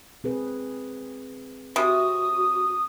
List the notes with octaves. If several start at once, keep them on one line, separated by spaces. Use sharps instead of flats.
C4 G#4 B4
C3 F#4 D#6